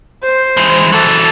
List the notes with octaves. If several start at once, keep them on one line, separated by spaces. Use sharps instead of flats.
C5
E3 G#3
E3 F#3 A4